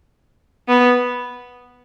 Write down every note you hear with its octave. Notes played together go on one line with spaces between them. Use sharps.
B3